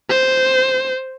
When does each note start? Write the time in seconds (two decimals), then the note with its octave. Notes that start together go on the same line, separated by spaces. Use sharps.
0.10 C5